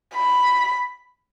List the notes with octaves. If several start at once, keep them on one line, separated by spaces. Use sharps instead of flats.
B5